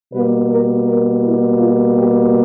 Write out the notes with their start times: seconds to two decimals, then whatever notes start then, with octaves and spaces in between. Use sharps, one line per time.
0.13 B2 G3 A#3 B4
0.50 A#4
0.87 A#4
1.23 E4
1.59 F4
1.95 G4